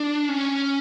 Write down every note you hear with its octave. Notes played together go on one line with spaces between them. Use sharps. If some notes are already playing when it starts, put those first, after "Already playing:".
Already playing: D4
C#4